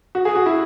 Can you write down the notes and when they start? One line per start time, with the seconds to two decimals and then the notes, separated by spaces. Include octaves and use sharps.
0.15 F#4
0.25 G#4
0.36 F#4
0.46 E4